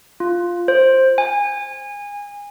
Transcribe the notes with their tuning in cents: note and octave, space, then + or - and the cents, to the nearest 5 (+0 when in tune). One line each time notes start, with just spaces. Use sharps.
F4 +0
C5 +10
G#5 -25